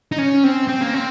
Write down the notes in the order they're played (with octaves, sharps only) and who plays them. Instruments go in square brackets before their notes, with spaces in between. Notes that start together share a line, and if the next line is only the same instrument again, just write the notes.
[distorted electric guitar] D#4
C#4
C4
C4
A#3
C4